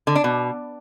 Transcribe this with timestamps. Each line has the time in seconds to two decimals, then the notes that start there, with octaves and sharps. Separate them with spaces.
0.07 D3
0.16 D4
0.24 B2